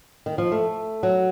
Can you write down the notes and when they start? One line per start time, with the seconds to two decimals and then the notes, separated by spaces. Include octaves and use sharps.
0.26 D#3
0.38 F3
0.52 A3
1.03 F#3